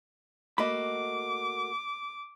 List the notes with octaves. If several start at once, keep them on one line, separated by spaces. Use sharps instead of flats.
A3 A#3 F#4 D#5 B5 D6